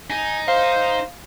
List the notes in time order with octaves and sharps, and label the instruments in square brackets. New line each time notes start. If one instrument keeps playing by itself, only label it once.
[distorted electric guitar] D#4 [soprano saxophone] G#5
[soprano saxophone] C5 [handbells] F5